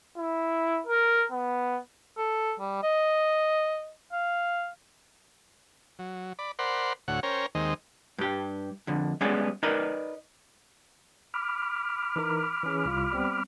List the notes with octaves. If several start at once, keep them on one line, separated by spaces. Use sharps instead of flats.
E4
A#4
B3
A4
G3
D#5
F5
F#3
D5 B5
A#4 C5 D5 F#5 B5 C6
D2 A2 F#4 C#5 F#5
C#4 A#4 C5 C#5 G5 A#5
D#2 D#3 G#3 C4 D#5
G2 G4
F2 D3
G3 G#3 B3 C#4 G#4 D5
D#4 A#4 B4 D5 D#5
B5 D6 F6
E3 D#4 A#4
E3 C#4 G#4
C2 F4
G3 B3 C4